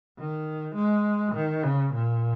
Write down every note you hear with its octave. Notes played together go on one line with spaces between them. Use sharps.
D#3
G#3
D#3
C#3
A#2